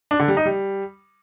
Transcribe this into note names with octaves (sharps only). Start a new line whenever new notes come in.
D4
D3
G3
D#4
G3